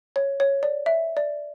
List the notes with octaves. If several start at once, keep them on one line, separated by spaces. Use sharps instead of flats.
C#5
C#5
D5
E5
D5